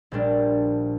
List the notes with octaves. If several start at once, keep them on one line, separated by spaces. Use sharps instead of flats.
A#1 A#2 G3 D4